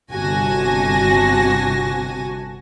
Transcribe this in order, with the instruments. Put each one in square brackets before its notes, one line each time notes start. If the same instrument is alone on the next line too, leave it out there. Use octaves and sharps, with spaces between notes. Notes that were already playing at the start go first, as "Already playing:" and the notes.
[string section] G1 C3 F#4 G#5 A5 A#6